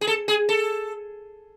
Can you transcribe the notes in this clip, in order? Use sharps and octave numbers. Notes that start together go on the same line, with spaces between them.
G#4
A4
G#4
A4